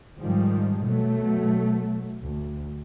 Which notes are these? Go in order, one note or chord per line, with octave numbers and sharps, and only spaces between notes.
G#2 D#3 F3 G3 G#3
B2 F#3 A3
D2